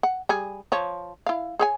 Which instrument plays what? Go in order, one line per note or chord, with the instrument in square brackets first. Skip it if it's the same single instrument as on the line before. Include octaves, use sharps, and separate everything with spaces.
[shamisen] F#5
G3 G#4
F3 C#5
E4 F5
G#4 C#5 G#5